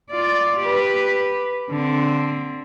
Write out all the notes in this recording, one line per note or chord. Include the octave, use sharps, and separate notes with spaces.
F4 D5
G4 B4
D3 C4